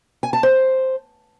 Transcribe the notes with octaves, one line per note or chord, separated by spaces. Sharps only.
G#5
A5
C5